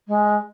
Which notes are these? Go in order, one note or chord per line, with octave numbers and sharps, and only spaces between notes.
G#3